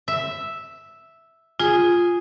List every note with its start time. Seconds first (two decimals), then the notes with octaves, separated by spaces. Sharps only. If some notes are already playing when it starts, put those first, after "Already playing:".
0.08 E5
1.60 F4 G#4